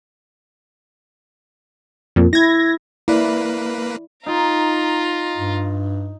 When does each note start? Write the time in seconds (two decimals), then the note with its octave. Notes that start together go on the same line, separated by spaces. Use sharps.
2.16 F2 A#2
2.33 E4 G#6 A#6
3.08 A#3 E4 B4 D5
4.26 D#4 F4 A#5
5.37 G2